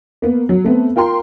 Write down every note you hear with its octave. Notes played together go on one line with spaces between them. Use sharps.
A#3 B3
F#3
A3 B3 C4
F4 A#4 G5 A#5 C6